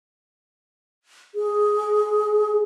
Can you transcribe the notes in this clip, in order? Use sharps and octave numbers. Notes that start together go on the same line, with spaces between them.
G#4